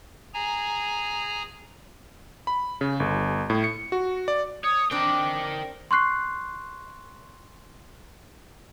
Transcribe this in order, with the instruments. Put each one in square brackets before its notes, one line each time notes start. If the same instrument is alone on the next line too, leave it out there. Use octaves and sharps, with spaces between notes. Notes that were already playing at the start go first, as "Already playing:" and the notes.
[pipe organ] G#4 G#5 A#5
[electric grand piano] B5
C#3
G1
A2
C#7
F#4
D5
[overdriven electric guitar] C#5 [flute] D#6
[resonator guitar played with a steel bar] C4 D4 [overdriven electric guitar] A#4 G5 [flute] D6
[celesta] C6 C#6 F#6 C7